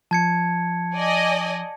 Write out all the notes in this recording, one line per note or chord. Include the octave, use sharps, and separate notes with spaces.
F3 A5 G#6 C#7
D5 D#5 G#5